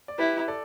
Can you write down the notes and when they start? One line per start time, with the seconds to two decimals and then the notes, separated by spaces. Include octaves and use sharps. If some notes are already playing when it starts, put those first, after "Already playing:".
0.08 D5
0.18 E4 G4 B4
0.48 A4 D5